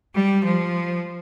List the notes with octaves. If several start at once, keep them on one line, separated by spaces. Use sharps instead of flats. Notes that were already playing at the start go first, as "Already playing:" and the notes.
G3
F3